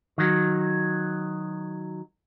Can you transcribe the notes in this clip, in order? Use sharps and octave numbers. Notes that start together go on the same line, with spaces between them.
D#3 F#3